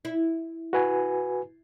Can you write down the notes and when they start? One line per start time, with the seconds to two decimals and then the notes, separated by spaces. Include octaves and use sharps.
0.05 E4
0.73 F#4 B4 G#5